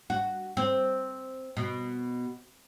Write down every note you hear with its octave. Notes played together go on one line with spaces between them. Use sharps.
F#4
C4
B2